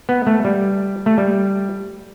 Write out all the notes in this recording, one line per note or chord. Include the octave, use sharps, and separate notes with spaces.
B3
A3
G3
A3
G3